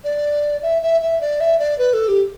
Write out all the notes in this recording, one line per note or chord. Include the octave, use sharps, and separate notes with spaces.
D5
E5
E5
E5
D5
E5
D5
B4
A4
G4